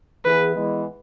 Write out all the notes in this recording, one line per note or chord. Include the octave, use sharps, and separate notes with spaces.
E3 B3 E4 G#4 B4
E3 G#3 B3